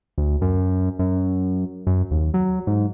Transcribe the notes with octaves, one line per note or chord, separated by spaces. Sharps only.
D2
F#2
F#2
F#2
D#2
F#3
G#2